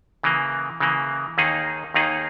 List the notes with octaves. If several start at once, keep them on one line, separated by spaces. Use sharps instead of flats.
C#3 E3 A#3
C#3 E3 A#3
D#2 D#3 A#3 D#4 G#4
D#2 D#3 A#3 D#4 G#4